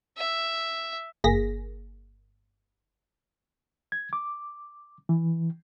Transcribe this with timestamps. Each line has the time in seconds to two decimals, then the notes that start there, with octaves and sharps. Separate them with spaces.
0.18 E5
1.24 G1 A#3 G#4 A#6 B6
3.92 G#6
4.13 D6
5.09 E3